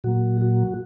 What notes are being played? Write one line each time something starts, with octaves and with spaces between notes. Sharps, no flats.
A#2 F#3 A#3 F#4
F#4